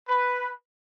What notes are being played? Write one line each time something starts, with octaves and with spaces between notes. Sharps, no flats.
B4